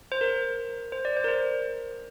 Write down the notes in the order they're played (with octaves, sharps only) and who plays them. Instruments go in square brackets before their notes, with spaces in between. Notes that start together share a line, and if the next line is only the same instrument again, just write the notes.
[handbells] C5
A#4
C5
D5
C5
A#4
C5